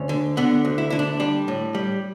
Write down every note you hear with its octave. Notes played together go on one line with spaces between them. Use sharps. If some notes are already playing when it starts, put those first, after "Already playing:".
Already playing: D2 C#4
D3
D3 B3
D2
E4
D3 E4
D4
G3 D4
A2
G3